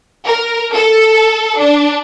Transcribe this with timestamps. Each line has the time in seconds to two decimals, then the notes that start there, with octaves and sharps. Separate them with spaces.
0.25 A#4
0.73 A4
1.58 D4